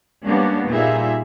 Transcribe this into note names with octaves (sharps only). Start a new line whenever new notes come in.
G3 G#3 A#3 B3 C#4 D4
A#2 G3 D#4 F4 G#4 E5